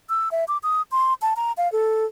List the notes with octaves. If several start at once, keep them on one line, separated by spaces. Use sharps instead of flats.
E6
E5
D6
D#6
C6
A5
A#5
F5
A4